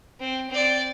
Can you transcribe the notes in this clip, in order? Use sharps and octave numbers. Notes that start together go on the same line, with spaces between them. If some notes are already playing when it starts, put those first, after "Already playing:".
C4
C4 D5